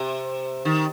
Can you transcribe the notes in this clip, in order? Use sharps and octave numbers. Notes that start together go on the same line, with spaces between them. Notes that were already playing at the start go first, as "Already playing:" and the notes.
Already playing: C3
D#3